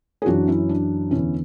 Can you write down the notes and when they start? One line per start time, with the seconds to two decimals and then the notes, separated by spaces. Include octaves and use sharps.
0.22 G#4
0.26 F#2 E3 D4 F#4
0.47 C#4 E4
0.69 D4
1.11 E2 D3 C#4 E4